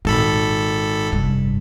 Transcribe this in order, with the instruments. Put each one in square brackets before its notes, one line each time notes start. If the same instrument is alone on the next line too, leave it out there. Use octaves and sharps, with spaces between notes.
[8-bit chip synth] G#1 A4 B5 [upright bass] A#2
[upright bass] F1 G2